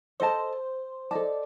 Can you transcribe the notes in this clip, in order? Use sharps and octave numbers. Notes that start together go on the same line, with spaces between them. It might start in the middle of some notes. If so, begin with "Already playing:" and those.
A4 C5 D#5 A5
A4 D5 D#5 A5